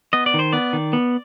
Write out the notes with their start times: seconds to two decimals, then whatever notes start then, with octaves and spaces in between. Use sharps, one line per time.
0.13 B3 D#5
0.26 D5
0.34 D#3
0.39 C5
0.53 B3 D5
0.73 D#3
0.93 B3